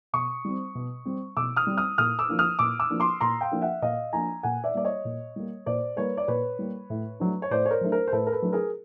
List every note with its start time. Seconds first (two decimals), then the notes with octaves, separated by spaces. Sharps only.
0.13 B2 C#6 D#6
0.45 G3 C4
0.75 B2
1.05 G3 C4
1.36 B2 D6 E6
1.56 D#6 F6
1.67 G3 C4
1.77 D#6 F6
1.98 A#2 D#6 F6
2.19 D6 E6
2.29 F3 A#3 D4
2.39 D#6 F6
2.59 A#2 D6 E6
2.80 D6 E6
2.90 F3 A#3 D4
3.00 C6 D6
3.21 A#2 A#5 C6
3.41 F5 G5
3.51 F3 A#3 D4
3.62 E5 F#5
3.82 A#2 D#5 F5
4.13 F3 A#3 D4 G#5 A#5
4.43 A#2 F#5 G#5
4.64 D5 E5
4.74 G3 A#3 D5
4.85 C#5 D#5
5.05 A#2
5.36 G3 A#3
5.66 A#2 C5 D5
5.97 G3 A#3 B4 C#5
6.17 D5
6.28 A#2 B4 C#5
6.59 G3 A#3
6.90 A2
7.20 F#3 A3 D4
7.42 C#5
7.51 A2 C5 D5
7.66 C#5
7.71 A#4 C5
7.81 F#3 A3 D4
7.92 A#4 C5
8.08 C5
8.12 A2 A4 B4
8.27 A#4
8.32 A4 B4
8.42 F#3 A3 D4
8.53 G#4 A#4